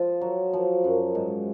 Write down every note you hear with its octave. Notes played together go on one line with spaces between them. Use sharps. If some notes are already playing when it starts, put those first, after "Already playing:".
Already playing: F3 F4
F#3
F3
F#2
G#2